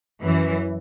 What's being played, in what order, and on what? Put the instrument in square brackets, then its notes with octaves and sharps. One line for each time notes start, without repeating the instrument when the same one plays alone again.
[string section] F#2 E3